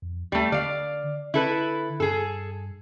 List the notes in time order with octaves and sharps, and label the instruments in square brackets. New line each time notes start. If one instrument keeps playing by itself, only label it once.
[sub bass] F2
[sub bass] D#2 [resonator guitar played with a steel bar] G3 A3
[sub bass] D3 [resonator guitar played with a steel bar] D5 F5
[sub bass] D3 [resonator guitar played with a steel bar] E4 A4 B4
[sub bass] G2 [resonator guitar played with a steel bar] G#4 A4